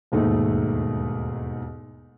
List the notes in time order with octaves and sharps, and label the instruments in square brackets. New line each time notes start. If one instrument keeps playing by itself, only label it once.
[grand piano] E1 D#2 G#2 A3 D#4